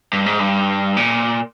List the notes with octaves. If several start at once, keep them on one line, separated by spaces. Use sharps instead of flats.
G2
G#2
G2
A#2